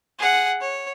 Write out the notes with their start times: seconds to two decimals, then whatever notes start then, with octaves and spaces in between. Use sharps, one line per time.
0.19 G#4 F#5
0.61 C#5